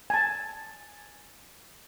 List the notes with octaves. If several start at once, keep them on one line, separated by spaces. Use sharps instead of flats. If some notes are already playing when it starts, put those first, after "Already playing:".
G#5 A5